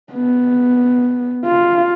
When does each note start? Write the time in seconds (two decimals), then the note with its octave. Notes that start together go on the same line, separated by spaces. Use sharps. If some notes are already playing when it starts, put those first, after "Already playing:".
0.13 B3
1.45 F4